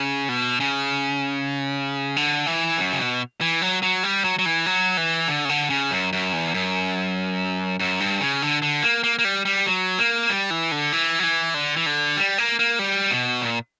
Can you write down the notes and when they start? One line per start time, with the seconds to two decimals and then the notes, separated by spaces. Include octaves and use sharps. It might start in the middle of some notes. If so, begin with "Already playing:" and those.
Already playing: C#3
0.29 B2
0.60 C#3
2.16 D3
2.47 E3
2.78 F#2
2.93 C#3
2.99 B2
3.41 E3
3.62 F#3
3.82 F#3
4.03 G3
4.24 F#3
4.39 F#3
4.46 E3
4.66 F#3
4.97 E3
5.28 D3
5.45 C#3
5.49 D3
5.70 C#3
5.91 F#2
6.13 F#2
6.33 E2
6.54 F#2
7.79 F#2
8.00 G2
8.20 C#3
8.42 D3
8.62 D3
8.83 A#3
9.04 A#3
9.19 A#3
9.25 G3
9.45 G3
9.66 F#3
9.98 A#3
10.30 G3
10.50 E3
10.71 D3
10.92 E3
11.19 F#3
11.23 E3
11.54 D3
11.76 E3
11.86 D3
12.17 G3
12.38 A#3
12.59 A#3
12.79 G3
13.11 B2
13.41 A#2